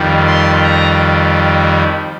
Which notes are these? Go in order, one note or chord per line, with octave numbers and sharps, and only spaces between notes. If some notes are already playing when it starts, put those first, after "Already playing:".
Already playing: F2 D#3 G3
C6
A#5